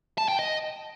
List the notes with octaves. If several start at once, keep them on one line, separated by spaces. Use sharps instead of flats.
A5
G5
D#5